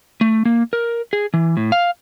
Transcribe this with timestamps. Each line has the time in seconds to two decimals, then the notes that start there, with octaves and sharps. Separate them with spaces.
0.21 A3
0.45 A#3
0.73 A#4
1.13 G#4
1.34 E3
1.57 A2
1.72 F5